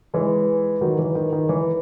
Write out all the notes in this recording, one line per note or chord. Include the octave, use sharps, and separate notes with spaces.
E3 G#3
D#3 F#3
E3
D#3
D#3
E3